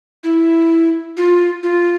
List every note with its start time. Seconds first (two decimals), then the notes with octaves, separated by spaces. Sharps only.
0.24 E4
1.17 F4
1.63 F4